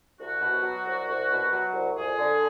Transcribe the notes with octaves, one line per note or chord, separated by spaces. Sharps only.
C2 F#4
B2
F#3
C2
C2
B2
F#3
C2
F2 G#4
D3